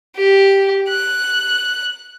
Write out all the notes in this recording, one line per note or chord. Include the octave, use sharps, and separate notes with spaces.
G4
F#6